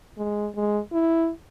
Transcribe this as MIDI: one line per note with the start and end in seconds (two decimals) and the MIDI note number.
0.18 0.48 56
0.56 0.79 56
0.92 1.30 64